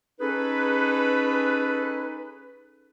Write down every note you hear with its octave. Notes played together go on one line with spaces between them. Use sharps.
C#4 D#4 G#4 A4 B4